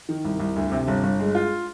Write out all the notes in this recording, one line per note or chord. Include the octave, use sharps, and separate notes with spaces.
D#3
C2
C2
D2
C3
G1
G1
G#3
F4